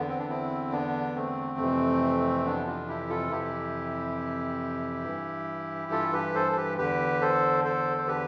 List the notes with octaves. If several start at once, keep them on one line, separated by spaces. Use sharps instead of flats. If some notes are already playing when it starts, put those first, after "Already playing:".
Already playing: E2 D3 B3
C4
D4
C4 E4
B3 D4
A3 C4
F2 C3 E3
B3 D4
D4 F4
E4 G4
F4 A4
F2 C3 E3 E4 G4
G2 E3
F4 A4
G4 B4
A4 C5
A4
G4 B4
E2 D3 G4 B4
A4 C5
A4 C5
C5
G4 B4